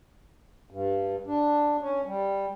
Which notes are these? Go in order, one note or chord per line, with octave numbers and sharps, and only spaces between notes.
G2
D4
C#4
G3